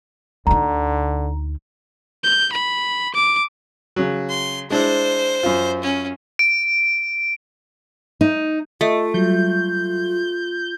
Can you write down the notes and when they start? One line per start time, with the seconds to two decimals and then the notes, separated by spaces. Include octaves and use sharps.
0.47 D2 D3 D#4 A#5
2.24 G6
2.52 B5
3.15 D6
3.96 C#3 F#3
4.29 C6
4.70 G#3 D4 E4 C5
5.43 F#2 F4
5.83 C#4
6.39 D7
8.21 D#4
8.81 A3 F4 D#5
9.14 F#3 G3 G6